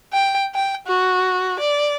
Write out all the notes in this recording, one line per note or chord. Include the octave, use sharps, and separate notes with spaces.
G5
G5
F#4
D5